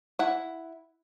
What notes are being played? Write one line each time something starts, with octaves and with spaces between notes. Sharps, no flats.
E4 F#5